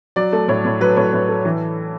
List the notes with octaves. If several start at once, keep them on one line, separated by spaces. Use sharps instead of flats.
F#3 D5
A3
A2 C#5
A2
F#3 B4
A2 C#5
A2 B4
A3
E3